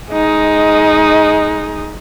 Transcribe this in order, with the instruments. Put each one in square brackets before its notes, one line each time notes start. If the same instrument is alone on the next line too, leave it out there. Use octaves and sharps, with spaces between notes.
[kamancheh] G#3 D#4